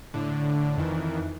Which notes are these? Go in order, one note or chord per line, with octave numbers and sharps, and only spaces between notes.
A2 D3
F2 D#3 E3